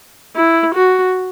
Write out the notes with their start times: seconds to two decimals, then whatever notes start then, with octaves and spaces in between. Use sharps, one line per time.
0.36 E4
0.75 F#4